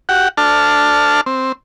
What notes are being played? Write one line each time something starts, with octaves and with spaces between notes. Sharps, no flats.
F#4 G4 F#5
D4 A4 A5 F6
C4